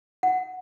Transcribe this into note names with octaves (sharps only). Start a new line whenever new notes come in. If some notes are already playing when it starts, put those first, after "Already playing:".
F#5